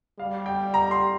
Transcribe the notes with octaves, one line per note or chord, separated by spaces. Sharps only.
G3 F5
G5
A#5
C6